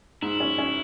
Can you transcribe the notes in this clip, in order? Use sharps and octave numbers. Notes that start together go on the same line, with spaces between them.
G#2 E4
C#4
C#4